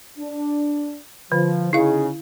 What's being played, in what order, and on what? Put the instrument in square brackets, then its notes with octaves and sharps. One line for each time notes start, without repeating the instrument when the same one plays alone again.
[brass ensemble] D4
[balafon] D3 [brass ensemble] F3
[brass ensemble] C#3 D#4 G#4 [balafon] E4 F5